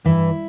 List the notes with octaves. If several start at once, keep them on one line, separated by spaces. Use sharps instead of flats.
G2 E3 E4